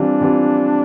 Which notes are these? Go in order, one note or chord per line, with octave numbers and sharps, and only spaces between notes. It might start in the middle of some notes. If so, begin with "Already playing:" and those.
Already playing: E3 G3 C4 D4 F4
E3 G3 C4 F4